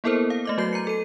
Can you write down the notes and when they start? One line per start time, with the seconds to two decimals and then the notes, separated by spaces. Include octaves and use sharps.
0.04 A#3 B3 E4 A4 A#4 C5
0.30 F5
0.45 A3 D#5 D6
0.58 F#3 F#4 G6 C7
0.73 A#5 C#7
0.87 A4 D#7